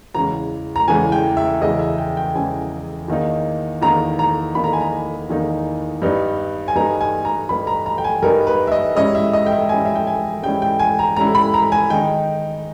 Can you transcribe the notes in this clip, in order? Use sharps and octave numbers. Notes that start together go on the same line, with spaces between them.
E2 C#3 E3 G#3 C#4 A#5
A#5
E2 C#3 E3 G#3 C#4 G#5
G5
E5
E2 C#3 E3 G#3 C#4 D#5
E5
G5
G5
E2 C#3 E3 G#3 C#4 G#5
E2 D#3 A#3 D#4
E2 D#3 A#3 D#4 A#5
A#5
E2 D#3 A#3 D#4 B5
A#5
G#5
A#5
E2 D#3 A#3 D#4
G2 G3 B3 D#4
G#5
G2 G3 B3 D#4 A#5
G#5
A#5
G2 G3 B3 D#4 B5
A#5
A#5
G5
G#5
G2 G3 B3 D#4 A#4
B4
E5
D#5
G#2 G3 C#4 E4 D#5
E5
D#5
G5
E5
G#2 G3 C#4 E4 G#5
E5
G5
G#5
G#2 G3 C#4 E4 G5
G5
G#5
A#5
G#2 G3 C#4 E4 A#5
B5
A#5
G#5
D#3 G#3 D#4 G5